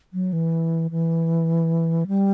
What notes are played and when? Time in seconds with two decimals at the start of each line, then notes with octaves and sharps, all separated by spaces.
0.14 F#3
0.33 E3
0.91 E3
2.08 G3